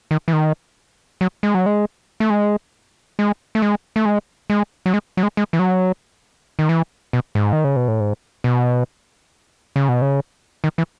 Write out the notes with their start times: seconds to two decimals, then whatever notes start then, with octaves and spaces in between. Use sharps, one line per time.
0.11 D#3
0.28 E3
0.33 D#3
1.21 F#3
1.43 G#3
1.54 F#3
1.66 G#3
2.20 A3
2.30 G#3
3.19 G#3
3.55 A3
3.62 G#3
3.96 A3
4.05 G#3
4.50 G#3
4.86 F#3
4.94 G#3
5.17 F#3
5.23 G#3
5.37 G#3
5.53 E3
5.59 F#3
6.59 D#3
6.69 E3
7.13 B2
7.35 G#2
7.53 D#3
7.64 C#3
7.76 B2
7.88 A2
8.00 G#2
8.44 B2
9.76 C#3
9.89 B2
10.02 C#3
10.64 D#3
10.78 E3